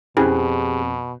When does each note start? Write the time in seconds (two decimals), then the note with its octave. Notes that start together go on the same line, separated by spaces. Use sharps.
0.17 F2 B2 C#4 E4 G4 G#4 C5 F#6